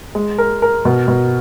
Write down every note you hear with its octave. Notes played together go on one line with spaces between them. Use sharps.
G#3
A#4
A#4
B2
B2